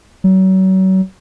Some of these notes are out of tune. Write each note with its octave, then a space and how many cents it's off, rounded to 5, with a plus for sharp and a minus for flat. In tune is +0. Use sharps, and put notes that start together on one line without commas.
F#3 +35